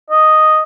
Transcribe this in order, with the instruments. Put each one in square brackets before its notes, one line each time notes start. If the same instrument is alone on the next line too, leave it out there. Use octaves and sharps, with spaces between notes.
[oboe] D#5